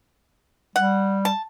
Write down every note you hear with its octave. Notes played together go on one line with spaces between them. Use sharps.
G3 F#5
A5